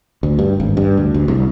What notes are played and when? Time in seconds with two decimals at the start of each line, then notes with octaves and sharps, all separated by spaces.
0.23 D2
0.39 G2
0.60 G#1
0.77 G2
0.97 D2
1.14 D2
1.28 C2